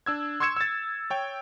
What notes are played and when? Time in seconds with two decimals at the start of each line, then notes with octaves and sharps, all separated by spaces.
0.06 D4 E6 G#6
0.40 C6 C#6 E6 G#6 C#7 E7
0.56 E6 A6
1.10 C#5 G5